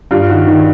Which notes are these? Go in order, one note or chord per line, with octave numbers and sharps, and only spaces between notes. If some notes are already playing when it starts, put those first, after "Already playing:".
G2 F4
D#3 F#4
D#3